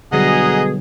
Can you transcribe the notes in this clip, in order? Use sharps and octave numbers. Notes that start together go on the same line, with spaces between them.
B2 D3 F#3 G3 G#4 D#5 F#5 A#5